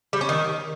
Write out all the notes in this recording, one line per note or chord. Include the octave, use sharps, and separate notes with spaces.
G3
C#4
D#3